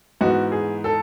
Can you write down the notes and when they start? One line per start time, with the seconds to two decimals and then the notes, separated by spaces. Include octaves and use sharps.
0.21 G#2 E3 B3 F#4
0.52 G#4
0.84 A4